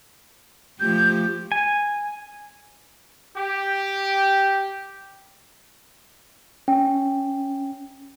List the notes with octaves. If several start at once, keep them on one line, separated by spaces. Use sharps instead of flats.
F3 A3 G4 G6
G#5
G4
C#4 G5